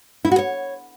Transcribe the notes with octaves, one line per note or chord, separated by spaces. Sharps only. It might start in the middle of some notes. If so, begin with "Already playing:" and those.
E4
F#4
C#5